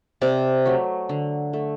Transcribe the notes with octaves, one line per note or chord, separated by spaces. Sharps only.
C3 D5
F#3 A3
D3
A3